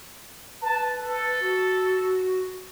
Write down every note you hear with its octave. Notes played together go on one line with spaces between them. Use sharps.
B4 A5
A4
F#4